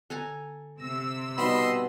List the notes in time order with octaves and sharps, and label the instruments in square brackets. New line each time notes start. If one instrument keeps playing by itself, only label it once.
[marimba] D3 [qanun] A4 G#5 A#5
[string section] C3 E6 [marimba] A#6
[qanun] B2 G3 [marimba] D#4 [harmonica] D#5 B5 C6